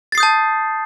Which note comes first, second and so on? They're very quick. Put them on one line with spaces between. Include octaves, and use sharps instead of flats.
A6 C7 D#6 G6 A5